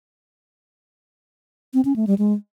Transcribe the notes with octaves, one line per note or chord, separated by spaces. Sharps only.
C4
C#4
A3
G3
G#3